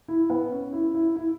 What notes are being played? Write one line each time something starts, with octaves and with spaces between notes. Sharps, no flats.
E4
B3
C#4
E4
E4
E4